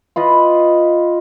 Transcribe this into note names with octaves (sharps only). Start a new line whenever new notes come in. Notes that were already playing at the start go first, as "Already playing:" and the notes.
F4 B4 D#5